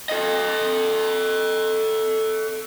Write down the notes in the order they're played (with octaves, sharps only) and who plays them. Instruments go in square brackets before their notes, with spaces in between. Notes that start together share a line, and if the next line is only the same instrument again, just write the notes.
[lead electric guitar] A4 D#5